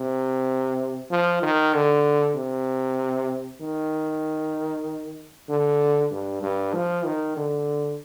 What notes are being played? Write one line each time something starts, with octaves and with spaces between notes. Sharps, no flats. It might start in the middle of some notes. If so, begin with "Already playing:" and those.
Already playing: C3
F3
D#3
D3
C3
D#3
D3
G2
G2
F3
D#3
D3